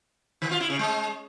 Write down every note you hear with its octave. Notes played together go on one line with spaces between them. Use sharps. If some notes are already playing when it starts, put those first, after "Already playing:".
D#3
F4
E4
C#3
G#3